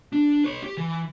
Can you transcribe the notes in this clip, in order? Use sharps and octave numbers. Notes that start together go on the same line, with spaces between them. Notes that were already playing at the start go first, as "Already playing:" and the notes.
D4
B4 C#5
G4
E3